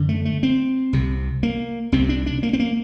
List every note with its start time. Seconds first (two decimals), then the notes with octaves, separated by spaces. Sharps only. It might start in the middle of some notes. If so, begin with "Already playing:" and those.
Already playing: F#2 D3
0.09 A3
0.25 A3
0.43 C4
0.93 C2 C3
1.43 A#3
1.92 C2 C3 C4
2.09 D4
2.26 D4
2.43 A#3
2.53 C4
2.60 A#3